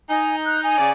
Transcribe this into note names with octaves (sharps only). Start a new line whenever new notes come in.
D#4 G#5
F#6
G#5
C#3 D5